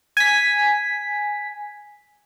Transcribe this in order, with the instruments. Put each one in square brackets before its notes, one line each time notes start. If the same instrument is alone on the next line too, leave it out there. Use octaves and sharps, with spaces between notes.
[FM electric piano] G#5 B6